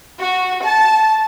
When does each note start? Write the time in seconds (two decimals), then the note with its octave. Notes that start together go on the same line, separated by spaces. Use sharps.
0.19 F#4
0.64 A5